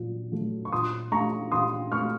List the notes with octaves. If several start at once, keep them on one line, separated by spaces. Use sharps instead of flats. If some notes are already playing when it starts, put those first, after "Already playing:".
Already playing: A#2 F#3
F#3 A3
C#6
A#2 C6 D#6
A3 A#5 C#6
A#2 C6 D#6
A3 C#6 F6